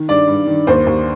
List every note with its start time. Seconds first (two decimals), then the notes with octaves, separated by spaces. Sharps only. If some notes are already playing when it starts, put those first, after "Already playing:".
Already playing: D#3
0.08 G2 D5
0.27 G2
0.47 D#3
0.67 D#2 C5
0.87 D#2